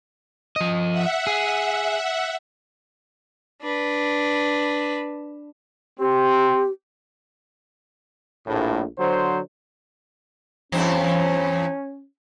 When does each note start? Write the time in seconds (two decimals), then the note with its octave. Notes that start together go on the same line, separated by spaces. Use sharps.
0.56 F3 D#5
0.92 E5 F#5
1.27 G#4
3.62 D4 B4
5.99 C4 G4
8.47 A#1 A2
8.98 D3 F#3 C5
10.72 E2 G2 C4 C#4